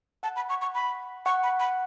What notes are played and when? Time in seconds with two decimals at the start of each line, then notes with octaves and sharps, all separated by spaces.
0.23 F#5 A5
0.36 B5
0.49 C#6
0.61 C#6
0.75 B5
1.26 F#5 C#6
1.43 B5
1.60 B5